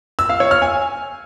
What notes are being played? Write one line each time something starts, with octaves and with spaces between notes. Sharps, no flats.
E6
F5
C#5
F6
G#5